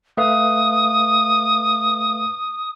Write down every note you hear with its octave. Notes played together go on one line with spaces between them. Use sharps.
A3 B4 F5 D#6